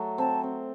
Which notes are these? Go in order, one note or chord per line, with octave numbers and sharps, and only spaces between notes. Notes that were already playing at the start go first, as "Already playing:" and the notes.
Already playing: F#3 A3
C4 A5
C4